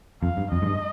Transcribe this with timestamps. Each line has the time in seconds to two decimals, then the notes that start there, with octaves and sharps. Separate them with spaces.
0.22 F2 F5
0.37 G2
0.52 F2 D#5
0.62 G#2
0.66 G2